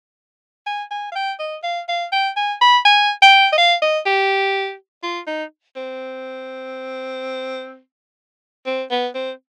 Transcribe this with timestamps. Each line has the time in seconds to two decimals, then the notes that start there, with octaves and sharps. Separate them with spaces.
0.67 G#5
0.91 G#5
1.12 F5
1.16 G5
1.39 D#5
1.63 F5
1.88 F5
2.12 G5
2.37 G#5
2.61 B5
2.85 G#5
3.22 G5
3.52 D#5
3.58 F5
3.82 D#5
4.06 G4
5.03 F4
5.27 D#4
5.76 C4
8.66 C4
8.91 B3
9.15 C4